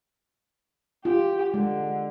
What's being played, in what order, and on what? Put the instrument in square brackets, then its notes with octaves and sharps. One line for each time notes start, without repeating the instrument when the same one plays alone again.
[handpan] F4 [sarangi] G4
[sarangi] D3 [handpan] G#3